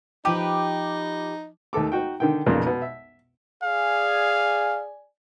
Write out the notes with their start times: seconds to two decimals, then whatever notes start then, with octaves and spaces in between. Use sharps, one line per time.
0.25 F3 D#4 G4 B4 D6
1.73 D#2 A3 A4 D6
1.92 D#4 F#4 G5
2.20 D3 D#3 G5
2.46 B1 F2 A#2 C#3
2.66 B2
2.82 E5
3.63 G#4 D5 F5 G#5